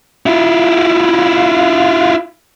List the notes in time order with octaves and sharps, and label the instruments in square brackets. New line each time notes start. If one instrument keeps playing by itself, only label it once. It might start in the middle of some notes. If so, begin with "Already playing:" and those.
[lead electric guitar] E4 F4